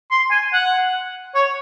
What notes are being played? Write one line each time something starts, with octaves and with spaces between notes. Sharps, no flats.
C6
G#5
F#5
C#5